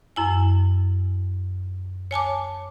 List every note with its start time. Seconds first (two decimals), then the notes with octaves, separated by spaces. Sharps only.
0.16 F#2 E4 G#5
2.11 C#5 G#5 A5 D6